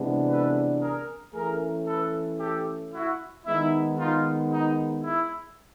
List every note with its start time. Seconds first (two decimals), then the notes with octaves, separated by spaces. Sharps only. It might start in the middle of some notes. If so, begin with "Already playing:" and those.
Already playing: C3 E3 G#3 B3 D4
0.28 A4 B4
0.80 G#4 A#4
1.33 E3 A3 C#4 G#4 A#4
1.86 A4 B4
2.39 G4 A4
2.92 E4 F#4
3.46 D#3 G#3 B3 D#4 E4
3.98 D#4 F4
4.51 D#4
5.04 E4